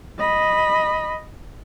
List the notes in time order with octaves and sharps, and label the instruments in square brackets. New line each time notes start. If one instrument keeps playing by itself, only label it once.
[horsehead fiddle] D#5 B5